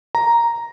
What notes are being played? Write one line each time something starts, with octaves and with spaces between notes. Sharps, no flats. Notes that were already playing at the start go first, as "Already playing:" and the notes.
A#5